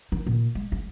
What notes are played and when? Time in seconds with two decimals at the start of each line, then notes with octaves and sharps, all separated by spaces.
0.12 D#3
0.26 A#2
0.55 G#3
0.72 G#3